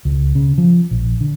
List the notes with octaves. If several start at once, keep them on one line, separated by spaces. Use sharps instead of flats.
C#2
C#3
F3
A#1
D3